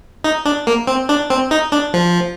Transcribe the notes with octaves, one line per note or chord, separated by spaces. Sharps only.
D#4
D4
A#3
C4
D4
C4
D#4
D4
F3